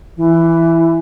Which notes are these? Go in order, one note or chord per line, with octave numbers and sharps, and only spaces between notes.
E3